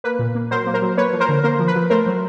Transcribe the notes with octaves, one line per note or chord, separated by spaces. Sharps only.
A#3 B4
A#2
A#3
F#3 A#4 C5
A#3
A#4 C5
F#3
A#3 B4 C#5
F3
A#4 C5
D3
A#3 A#4 C5
F3
B4
F3
A3 A#4 C5
F#3